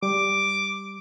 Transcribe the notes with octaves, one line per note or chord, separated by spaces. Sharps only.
G3 D6